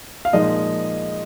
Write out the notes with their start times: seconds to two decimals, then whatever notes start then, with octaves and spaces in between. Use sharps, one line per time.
0.25 F5
0.33 A#2 F3 G#3 D#4 D#5